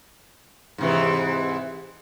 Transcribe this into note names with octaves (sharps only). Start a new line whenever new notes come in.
G#2 C3 E3